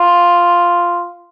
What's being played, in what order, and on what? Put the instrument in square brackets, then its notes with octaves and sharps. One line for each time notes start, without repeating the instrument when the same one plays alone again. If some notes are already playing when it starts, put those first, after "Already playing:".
Already playing: [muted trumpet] F4